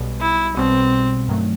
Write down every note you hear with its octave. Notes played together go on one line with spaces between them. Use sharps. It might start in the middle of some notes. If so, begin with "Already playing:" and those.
Already playing: B1 B2 G3
E4
B1 B2 G3 C4
G2 D#3 F#3 A3